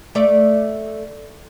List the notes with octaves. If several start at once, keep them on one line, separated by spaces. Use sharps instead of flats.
A3 D5